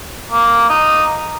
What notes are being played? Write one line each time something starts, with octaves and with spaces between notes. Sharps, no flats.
A#3
D#4